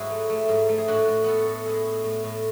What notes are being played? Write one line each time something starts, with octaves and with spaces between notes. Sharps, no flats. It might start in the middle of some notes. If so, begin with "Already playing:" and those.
Already playing: G#2 F#3 D4 E4 F#4 G#4
A3
A3
G#2
A3
G#4
A2 D4 F#4
A2
B3 F#4 A4
A2
G#3 E4 G#4
A2
A2
A2